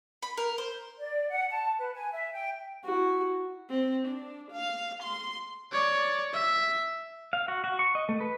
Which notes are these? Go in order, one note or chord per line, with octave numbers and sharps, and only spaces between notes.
B5
A#4
C5
D5
F#5
A5
B4
G#5
E5
G5
E4 F#4
C4
D4
F5
C6
C#5 D5
E5
F5
F#4
F#4
C#6
D#5
A3
B4